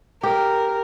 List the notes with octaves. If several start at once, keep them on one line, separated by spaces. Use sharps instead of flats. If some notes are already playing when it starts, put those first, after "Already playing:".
G4 A#4